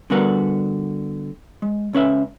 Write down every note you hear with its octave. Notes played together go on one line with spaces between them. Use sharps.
D3 G3 B3 F#4 A#4 B4
G#3
C#2 C#4 B4 E5